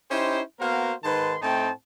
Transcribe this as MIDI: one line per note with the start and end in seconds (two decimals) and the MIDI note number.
0.11 0.41 61
0.11 0.41 63
0.11 0.41 64
0.11 0.41 67
0.11 0.41 72
0.60 0.93 58
0.60 0.93 59
0.60 0.93 66
0.60 0.93 70
0.60 0.93 72
0.60 0.93 77
1.04 1.36 44
1.04 1.36 51
1.04 1.36 71
1.04 1.36 81
1.04 1.36 84
1.42 1.70 45
1.42 1.70 57
1.42 1.70 60
1.42 1.70 63
1.42 1.70 79
1.42 1.70 81